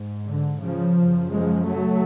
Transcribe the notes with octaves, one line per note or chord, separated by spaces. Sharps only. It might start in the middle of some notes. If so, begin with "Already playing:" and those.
Already playing: G#2
D3
C#3 F3
F#2 C#3
F3 G#3
F#3 A3